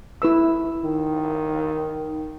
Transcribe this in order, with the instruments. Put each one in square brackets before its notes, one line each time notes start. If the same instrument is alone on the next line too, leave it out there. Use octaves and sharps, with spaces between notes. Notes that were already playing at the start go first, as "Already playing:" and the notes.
[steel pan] E4 B4 E6
[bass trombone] D#3